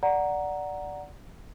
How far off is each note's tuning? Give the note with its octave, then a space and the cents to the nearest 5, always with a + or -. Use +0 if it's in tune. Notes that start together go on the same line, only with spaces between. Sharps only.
D5 +0 F#5 +0 A#5 +0